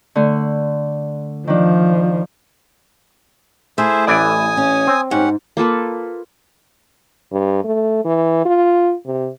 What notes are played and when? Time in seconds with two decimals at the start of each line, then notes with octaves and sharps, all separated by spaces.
0.15 D3 A3
1.48 D#3 F3 D4
3.78 A3 E4 G#4 C5 E5
4.07 A1 E3 D5 G#5 D#6
4.57 C#4
4.87 C4
5.11 G#2 C#4 G4 F#5
5.57 A#3 F4 A4 B4
7.32 G2
7.64 A3
8.05 E3
8.45 F4
9.06 C3